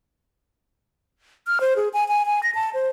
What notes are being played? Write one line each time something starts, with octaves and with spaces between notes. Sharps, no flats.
F6
C5
G#4
G#5
G#5
G#5
A#6
A5
C5